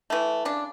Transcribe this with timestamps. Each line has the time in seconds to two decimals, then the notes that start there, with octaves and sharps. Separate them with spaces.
0.10 E3 A3
0.45 C#3 D4